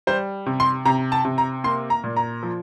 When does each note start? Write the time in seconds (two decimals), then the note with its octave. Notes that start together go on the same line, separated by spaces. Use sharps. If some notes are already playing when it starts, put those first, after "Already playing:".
0.07 G3 C5
0.46 C3
0.60 C6
0.85 C3 A#5
1.12 A5
1.25 C3
1.38 A#5
1.64 A#3 C6
1.90 A#5
2.04 A#2
2.17 A#5
2.43 F3